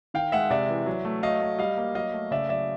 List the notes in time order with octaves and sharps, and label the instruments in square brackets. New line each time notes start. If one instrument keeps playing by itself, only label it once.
[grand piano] D#3 F5 G5
G#3 E5 F#5
C3 D5 E5
E3
F#3
A3
F#3 D#5 F5
A3
G3 D#5 F5
A#3
F#3 D#5 F5
A3
C#3 D5 E5
F#3 D5 E5